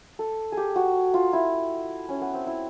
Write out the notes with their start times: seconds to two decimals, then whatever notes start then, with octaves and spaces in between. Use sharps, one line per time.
0.19 A4
0.52 G#4
0.57 G4
0.76 F#4
1.14 F4
1.33 E4
2.09 C#4
2.22 B3
2.34 C4
2.47 E4